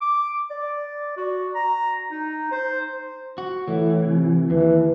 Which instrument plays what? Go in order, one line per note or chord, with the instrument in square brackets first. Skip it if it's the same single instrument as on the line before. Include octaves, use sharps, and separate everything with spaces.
[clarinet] D6
D5
F#4
A#5
D#4
C5
[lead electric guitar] F#4
[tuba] A2 [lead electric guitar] E3
[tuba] C3
[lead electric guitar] D#2 [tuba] E3